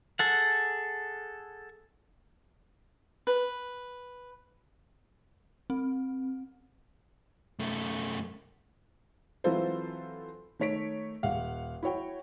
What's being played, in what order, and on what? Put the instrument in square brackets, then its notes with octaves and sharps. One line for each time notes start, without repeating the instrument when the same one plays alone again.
[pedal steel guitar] G#4 A4 F#5
[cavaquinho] B4
[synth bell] C4
[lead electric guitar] F#2 A3
[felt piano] E3 F#3 C4 F4 A4 C5
D#3 A3 C#5 B6 D7
D#1 F5 F#5
E4 F#4 C#5 G5